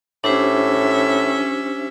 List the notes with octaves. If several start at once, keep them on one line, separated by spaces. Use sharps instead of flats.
A2 C#4 D4 G4 C5 E5